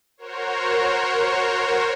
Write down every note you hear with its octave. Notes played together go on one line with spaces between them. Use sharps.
F#4 A#4 C5 C#5